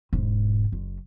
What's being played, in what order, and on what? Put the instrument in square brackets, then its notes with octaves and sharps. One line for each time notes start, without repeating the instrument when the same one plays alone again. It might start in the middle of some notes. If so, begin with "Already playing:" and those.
[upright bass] E1 G#2
F#1